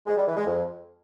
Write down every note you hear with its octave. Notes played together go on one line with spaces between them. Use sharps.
G#3
G3
E3
G#3
F2